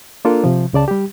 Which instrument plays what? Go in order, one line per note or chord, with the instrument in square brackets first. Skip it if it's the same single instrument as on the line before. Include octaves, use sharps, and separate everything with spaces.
[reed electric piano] A#3 D4 F4 A4 A#4
C3 F3
C#2 C#3 D5 A5
G3 G4